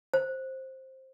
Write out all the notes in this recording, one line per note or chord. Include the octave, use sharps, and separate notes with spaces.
C5